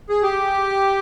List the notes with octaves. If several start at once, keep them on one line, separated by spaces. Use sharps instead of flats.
G#4
G4